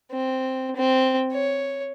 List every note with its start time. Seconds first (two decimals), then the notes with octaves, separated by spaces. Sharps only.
0.12 C4
0.76 C4
1.32 C#5